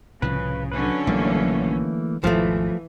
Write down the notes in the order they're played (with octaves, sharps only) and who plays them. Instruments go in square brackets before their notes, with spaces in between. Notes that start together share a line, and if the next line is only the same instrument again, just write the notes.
[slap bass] C2 A2 F3 [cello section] C#3 [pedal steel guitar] B4
[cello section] D3 F#3 C#4 [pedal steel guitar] B4
[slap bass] A#1 G3 [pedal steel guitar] E3 A3 A#3
[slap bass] G#1 E2 B2 [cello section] E3 [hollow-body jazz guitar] F3 A3